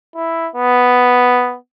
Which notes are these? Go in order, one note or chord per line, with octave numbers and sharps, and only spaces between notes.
E4
B3